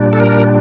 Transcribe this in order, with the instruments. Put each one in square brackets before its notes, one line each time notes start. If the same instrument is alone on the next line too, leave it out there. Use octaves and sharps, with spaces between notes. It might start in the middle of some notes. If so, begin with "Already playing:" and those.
Already playing: [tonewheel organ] A#2 G3 D4
A4
A#4